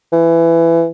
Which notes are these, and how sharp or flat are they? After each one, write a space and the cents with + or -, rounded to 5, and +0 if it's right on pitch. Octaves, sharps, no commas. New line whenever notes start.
E3 +20